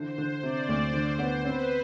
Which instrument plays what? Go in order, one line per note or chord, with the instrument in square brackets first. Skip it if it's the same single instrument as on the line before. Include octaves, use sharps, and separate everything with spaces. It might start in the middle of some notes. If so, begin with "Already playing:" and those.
Already playing: [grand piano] D3 E3 [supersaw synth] C5
[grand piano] D3
[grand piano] C3 [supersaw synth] D5
[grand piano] D2
[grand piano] D3 [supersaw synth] C5
[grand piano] B3
[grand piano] C4 [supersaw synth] B4